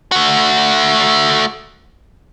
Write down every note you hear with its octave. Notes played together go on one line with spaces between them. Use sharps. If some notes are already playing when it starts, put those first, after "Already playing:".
A3 F#4